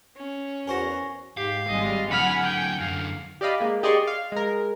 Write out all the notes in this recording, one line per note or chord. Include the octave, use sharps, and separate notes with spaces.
C#4
E2 F#4 A#4 C5 F#5 G#5 C#6 A#6
G#2 G4 F5
G#1 G3 G#3 D#5
D3 F#3 F#5 G#5 B5 F6
G5
F#2 D3 F5
G4 D5 D#5 F5 B5
G#3 A#3
G4 G#4 D5 D#5 C6 C#6
F5
G#3 A#4